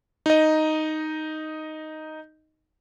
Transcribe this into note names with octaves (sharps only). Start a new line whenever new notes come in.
D#4 D#5